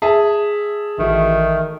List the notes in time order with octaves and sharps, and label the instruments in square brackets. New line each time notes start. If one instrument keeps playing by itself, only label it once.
[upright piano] G#4 E5 A5
[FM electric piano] A1 E3 F#4 [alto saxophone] D#3 [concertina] A3